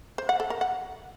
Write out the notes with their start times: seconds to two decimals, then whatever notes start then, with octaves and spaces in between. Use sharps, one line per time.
0.18 C5
0.29 F#5
0.40 A4
0.50 A#4
0.61 F#5